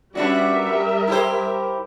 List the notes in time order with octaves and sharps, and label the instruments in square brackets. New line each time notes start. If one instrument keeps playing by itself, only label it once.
[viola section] G3 E5 [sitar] B3 D4 F#4 [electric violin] C#4 D5
[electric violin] A#4
[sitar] E4 G4 C5